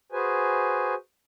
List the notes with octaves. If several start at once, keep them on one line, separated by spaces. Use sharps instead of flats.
F#4 G#4 B4 C5 G#5